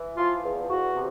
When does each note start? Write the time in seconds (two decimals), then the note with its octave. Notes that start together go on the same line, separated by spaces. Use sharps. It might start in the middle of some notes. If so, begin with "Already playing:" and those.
Already playing: E3
0.17 F3 F4
0.44 E2
0.69 E2 F#4
0.95 C3